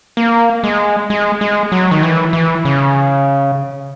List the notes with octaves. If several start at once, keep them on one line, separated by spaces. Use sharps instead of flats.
A#3
G#3
G#3
G#3
F#3
D#3
E3
E3
C#3